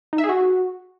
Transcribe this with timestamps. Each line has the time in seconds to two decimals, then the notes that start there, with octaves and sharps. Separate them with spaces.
0.13 D#4
0.18 E5
0.24 G#4
0.29 F#4